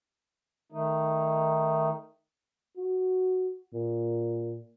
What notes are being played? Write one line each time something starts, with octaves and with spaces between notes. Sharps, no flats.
D#3 A3 D#4
F#4
A#2